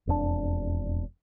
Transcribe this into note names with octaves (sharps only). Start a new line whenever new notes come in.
E1 F2 E3 D4